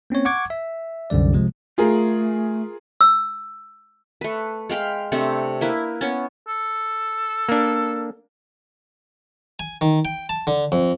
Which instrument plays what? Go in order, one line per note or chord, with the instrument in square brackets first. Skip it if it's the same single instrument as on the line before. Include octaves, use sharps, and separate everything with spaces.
[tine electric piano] A#3 C4 C#4 C#5
F#5 C#6 D6 G#6
E5
C2 F#2 D3 G3 D5
C3 F3 G#3
[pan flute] A3 [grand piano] F4 G#4 A#4
[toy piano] E6
[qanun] A3 B4
G#3 F5 G5 B5
C3 A3 C4 D4
A#3 E4 B4
B3 C#4
[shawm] A4
[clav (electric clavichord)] A#3 D4
[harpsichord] G#5
D#3
G5
A5
D3
F2